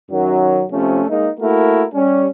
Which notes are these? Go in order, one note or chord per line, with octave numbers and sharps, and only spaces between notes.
F#2 D#3 F#3
C3 F3 A3 C#4
G#3 A#3 D#4
A3 A#3 E4 F#4 A#4
G3 C#4